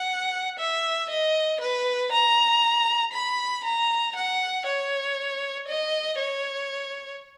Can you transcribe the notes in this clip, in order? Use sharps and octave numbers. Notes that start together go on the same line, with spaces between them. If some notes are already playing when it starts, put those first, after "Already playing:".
Already playing: F#5
E5
D#5
B4
A#5
B5
A#5
F#5
C#5
D#5
C#5